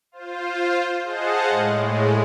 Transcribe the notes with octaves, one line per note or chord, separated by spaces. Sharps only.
F4 C5
G#4 C5 D#5 F5 F#5 A5
A2 G#3